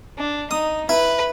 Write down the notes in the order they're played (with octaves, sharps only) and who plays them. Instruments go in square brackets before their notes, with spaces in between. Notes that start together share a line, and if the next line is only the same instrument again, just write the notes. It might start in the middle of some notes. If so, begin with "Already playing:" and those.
[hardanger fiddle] D4
[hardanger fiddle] D#4 [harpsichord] D#6
[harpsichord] E4 [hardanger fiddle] B4